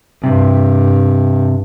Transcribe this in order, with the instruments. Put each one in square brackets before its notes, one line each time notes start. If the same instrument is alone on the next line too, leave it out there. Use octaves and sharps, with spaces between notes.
[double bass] G2 [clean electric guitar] C3